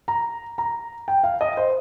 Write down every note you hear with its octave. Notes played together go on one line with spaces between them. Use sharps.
A#5
A#5
G5
F5
D#5
C5